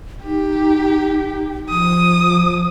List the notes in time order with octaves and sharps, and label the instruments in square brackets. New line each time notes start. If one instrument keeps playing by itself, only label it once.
[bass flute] D#4 [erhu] G4
[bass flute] F3 [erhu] D#6